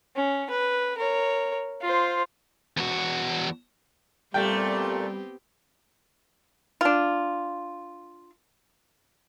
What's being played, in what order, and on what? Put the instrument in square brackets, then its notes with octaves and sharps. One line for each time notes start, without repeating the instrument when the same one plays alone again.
[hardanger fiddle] C#4
B4
A#4 C#5
F4 C5
[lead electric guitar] E2 F#4
[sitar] A#2 A3 [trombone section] G3 [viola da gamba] B3 C4 G4 [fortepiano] G5
[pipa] D4 F4